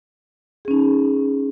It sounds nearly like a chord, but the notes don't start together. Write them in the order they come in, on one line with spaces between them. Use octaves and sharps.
G#4 C#4 D#4